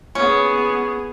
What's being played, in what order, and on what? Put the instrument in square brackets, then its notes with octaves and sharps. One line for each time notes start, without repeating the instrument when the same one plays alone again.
[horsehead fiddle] B3 G#4 [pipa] C#4